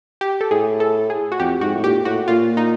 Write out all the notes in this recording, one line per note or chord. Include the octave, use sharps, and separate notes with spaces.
G4
A4
A2 G#4
A4
G#4
F#4
F2 G4
G#2 F#4
A2
A#2 G4
A2 F#4
A#2 F4
D#4